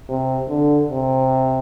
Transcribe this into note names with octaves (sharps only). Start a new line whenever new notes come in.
C3
D3
C3